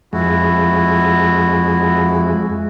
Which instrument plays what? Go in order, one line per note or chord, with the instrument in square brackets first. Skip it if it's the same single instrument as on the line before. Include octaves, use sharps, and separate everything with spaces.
[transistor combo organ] F2 G#3 [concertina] E4 F#4